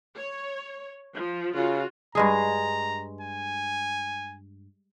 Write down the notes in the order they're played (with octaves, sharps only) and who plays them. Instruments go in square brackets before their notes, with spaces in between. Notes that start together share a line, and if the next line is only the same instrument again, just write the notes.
[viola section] C#5
F3
[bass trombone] C#3 [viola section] F4 F#4
[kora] G2 G#3 G#4 [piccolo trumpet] A#5
[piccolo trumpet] G#5